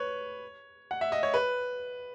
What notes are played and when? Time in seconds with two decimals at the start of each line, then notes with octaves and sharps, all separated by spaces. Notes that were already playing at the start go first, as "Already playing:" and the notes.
Already playing: B4 C#5
0.91 F#5
1.01 E5
1.12 D#5
1.23 C#5
1.34 B4